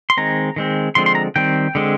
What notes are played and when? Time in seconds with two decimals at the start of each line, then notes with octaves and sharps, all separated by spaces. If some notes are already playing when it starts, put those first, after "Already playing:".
0.10 C6
0.17 D#3 G#3 C4 A#5
0.56 D#3 G#3 C4
0.95 D3 F3 G#3 C4 C6
1.06 C6
1.15 A#5
1.36 D#3 G3 C4 G5
1.75 D3 G#3 C4